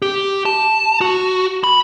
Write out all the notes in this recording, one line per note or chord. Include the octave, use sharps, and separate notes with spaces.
G4
A5
F#4
B5